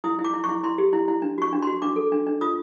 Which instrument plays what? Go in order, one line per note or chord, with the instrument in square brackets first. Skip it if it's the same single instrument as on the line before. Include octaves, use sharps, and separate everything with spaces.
[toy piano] E4 D#6
E4
D6
E4
E4 C#6
E4 C6
G4
E4
E4
D4
F#4 C#6
D4
F#4 C6
D4 D6
A4
D4
D4
F4 D#6